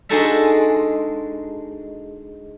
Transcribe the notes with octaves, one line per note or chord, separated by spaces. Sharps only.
G#3 D4 D#4 F#4 A4 E5